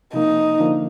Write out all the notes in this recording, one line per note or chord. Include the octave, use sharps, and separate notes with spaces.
C3 F3 A#3 D#4
D3 F3 A#3 D4 F4